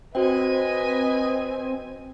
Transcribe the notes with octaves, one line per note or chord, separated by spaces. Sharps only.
C4 F#4 B4 C5 D#5 G5 G#5